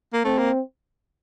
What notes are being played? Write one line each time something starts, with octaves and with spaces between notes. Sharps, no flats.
A#3
A3 C4
A#3